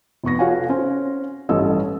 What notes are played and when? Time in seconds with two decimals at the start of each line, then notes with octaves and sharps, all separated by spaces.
0.24 F1 B3 C#6 A#6
0.39 F#4 A4 C#5 F5 F#5 G#5
0.69 C#4 C5
1.49 A1 G2 C#4 A4 D#5 E6